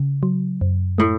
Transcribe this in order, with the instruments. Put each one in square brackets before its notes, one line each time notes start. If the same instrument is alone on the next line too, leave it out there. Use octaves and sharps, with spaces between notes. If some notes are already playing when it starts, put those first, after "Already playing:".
Already playing: [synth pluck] C#3
F#3
F#2
[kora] A2 [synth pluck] A3